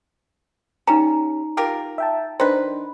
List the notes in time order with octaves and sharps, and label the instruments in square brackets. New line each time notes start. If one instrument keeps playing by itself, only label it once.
[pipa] G3 C#4 [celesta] D#4 A#5
[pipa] F4 G4 A#4
[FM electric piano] E5 G5 A5
[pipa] D#3 B4 [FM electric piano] D4 C5